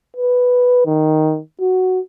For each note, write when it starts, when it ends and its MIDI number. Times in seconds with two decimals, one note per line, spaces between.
0.16 0.82 71
0.86 1.39 51
1.61 2.00 66